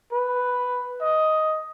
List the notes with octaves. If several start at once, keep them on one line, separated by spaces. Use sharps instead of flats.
B4
D#5